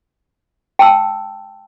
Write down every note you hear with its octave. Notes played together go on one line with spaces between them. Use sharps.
G5 A5 E6